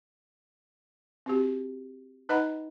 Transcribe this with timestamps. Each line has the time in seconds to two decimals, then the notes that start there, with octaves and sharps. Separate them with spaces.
1.26 C4 F#4 G4
2.29 D#4 B4 D#5 F#5 A#5 B5